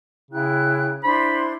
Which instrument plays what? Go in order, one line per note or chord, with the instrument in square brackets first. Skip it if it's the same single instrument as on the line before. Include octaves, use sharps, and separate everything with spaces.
[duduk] C#3 [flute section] E4 G5 F#6
[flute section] D4 C5 C6 [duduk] E4 [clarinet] B5